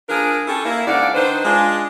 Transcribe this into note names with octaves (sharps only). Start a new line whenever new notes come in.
F3 D4 G#4 A#4
C#4 E4 G4 A4
A#3 E4
G#2 C#3 D4 D5 F5 F#5
D#3 D4 D#4 B4 C5
G#3 D4 F4